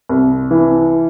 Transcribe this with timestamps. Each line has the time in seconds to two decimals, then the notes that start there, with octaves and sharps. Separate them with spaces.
0.09 C2
0.51 E3